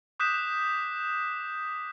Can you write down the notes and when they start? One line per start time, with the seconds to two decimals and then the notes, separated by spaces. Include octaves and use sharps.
0.20 D6 D#6 F#6 G6 B6 E7